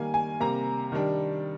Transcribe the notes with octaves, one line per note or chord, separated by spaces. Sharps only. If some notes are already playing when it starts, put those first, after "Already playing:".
Already playing: D#3 G3 A#3 G#5
G#5
C3 G3 A#3 A#5
D#3 G3 D4